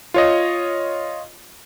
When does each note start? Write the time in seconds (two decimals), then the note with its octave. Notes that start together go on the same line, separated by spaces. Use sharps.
0.14 F4 C#5 D#5